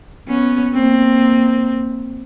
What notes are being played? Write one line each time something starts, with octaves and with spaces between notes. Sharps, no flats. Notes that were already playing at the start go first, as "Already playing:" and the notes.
B3 C#4
A#3 C4